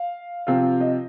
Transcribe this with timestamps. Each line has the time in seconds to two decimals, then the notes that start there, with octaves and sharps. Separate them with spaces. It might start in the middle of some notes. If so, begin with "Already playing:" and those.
Already playing: F5
0.47 C3 F3 C4 F4 F5
0.80 D#5